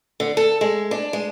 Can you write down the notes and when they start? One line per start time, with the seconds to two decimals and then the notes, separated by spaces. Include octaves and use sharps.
0.20 D3
0.37 A4
0.61 G#3
0.91 D4
1.13 G#3